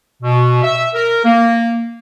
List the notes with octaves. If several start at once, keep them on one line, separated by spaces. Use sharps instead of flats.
B2
E5
A#4
A#3